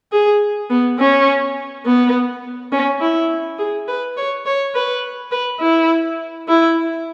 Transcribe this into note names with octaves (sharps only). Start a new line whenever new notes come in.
G#4
B3
C#4
B3
C#4
E4
G#4
B4
C#5
C#5
B4
B4
E4
E4